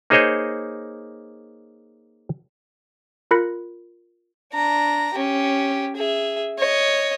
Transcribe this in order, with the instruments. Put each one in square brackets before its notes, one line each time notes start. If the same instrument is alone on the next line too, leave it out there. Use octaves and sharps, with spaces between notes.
[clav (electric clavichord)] A#3 D#4 G#4 C5 C#5 D#5
[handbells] F4 A#4 B5 F#6 A#6 C#7
[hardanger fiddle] D4 A#5
C#4 G4
G#4 E5
C#5 D#5